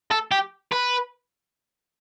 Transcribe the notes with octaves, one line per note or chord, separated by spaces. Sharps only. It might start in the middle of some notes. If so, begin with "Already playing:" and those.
A4
G4
B4